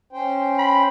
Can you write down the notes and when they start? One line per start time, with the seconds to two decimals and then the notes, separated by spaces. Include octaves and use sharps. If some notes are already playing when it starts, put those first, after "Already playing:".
0.13 C#4 C5 G5
0.58 B5